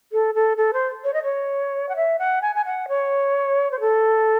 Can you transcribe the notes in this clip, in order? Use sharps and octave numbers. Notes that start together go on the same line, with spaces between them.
A4
A4
A4
C5
C#5
D#5
C#5
F#5
E5
F#5
G#5
G#5
F#5
C#5
C5
A4